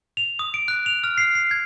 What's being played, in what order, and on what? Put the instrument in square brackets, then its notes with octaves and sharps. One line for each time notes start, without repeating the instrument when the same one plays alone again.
[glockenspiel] F7
D#6
D7
F#6
F7
F6
C7
C7
G#6